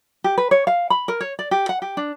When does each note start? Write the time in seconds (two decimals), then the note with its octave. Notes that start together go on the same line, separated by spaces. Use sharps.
0.24 G4
0.38 B4
0.51 C#5
0.67 F5
0.90 B5
1.08 A#4
1.21 C#5
1.39 D5
1.51 G4
1.69 F#5
1.82 G4
1.97 D4